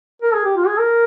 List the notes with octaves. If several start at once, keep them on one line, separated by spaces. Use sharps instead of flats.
A#4
G#4
G4
F4
G#4
A#4